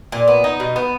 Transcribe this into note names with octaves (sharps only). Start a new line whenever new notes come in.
A#2
B3
D#4
B2
B3